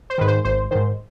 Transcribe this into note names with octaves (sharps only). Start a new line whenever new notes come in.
C5
G#2 D#3 B4
C5
G#1 C5
G#2 D#3 C5